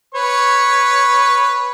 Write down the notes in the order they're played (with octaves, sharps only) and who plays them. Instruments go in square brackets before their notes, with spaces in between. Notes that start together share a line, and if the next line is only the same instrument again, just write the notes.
[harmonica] B4 C#5 C#6